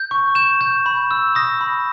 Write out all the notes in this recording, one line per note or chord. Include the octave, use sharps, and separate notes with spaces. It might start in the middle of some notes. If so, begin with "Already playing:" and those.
Already playing: G6
C#6
G6 E7
G6
B5
E6
D#6 A#6
B5